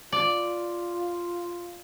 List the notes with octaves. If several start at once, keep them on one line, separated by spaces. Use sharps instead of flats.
F4 D5